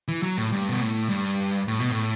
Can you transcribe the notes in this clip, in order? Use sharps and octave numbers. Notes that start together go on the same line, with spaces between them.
E3
F#3
A2
G2
B2
A2
G2
A2
B2
A2